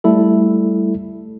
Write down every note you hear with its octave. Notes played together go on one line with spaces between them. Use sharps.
G3 A3 E4 A4